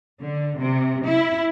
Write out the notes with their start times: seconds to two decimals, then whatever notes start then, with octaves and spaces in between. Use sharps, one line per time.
0.21 D3
0.60 C3
1.07 E4